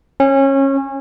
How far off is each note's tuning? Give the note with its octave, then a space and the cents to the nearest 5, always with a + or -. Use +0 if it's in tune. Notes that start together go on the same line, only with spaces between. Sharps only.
C#4 -25